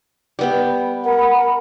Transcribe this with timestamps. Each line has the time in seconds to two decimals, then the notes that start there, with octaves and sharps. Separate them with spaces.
0.39 G3 B3 G5
1.04 A#4 F#5 B5